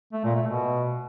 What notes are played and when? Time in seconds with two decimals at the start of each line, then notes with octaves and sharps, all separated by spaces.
0.13 A3
0.24 A#2
0.36 A3
0.47 B2